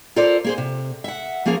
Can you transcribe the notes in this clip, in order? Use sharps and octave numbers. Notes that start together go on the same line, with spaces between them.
F4 A4 A#4 C5 D5
A#3 G#4 C5
C3
E5 F#5
F3 A#3 C#4 G#4 A#4